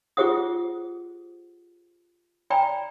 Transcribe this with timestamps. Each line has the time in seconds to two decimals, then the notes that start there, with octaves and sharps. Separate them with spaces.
0.17 F4 G4 G#4 C5 F#5 D#6
2.50 D5 G5 G#5 A#5 B5